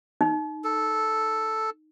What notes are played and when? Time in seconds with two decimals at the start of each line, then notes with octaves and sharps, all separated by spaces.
0.21 D#4
0.64 A4